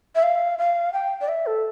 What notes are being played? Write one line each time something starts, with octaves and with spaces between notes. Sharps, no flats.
E5
F5
F5
G5
D5
E5
A4